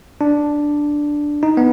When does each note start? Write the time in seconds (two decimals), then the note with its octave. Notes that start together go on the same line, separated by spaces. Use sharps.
0.21 D4
1.43 D#4
1.57 B3